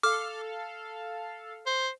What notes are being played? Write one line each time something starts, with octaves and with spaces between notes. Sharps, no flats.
A4 F5 D6 F6
C5